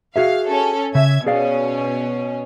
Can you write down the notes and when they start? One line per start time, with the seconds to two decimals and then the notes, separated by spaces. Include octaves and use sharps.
0.16 F#4 G#4 E5 F5
0.48 C#4 A4
0.95 C#3 E5 G#6
1.26 B2 C#4 G#4 D5 F5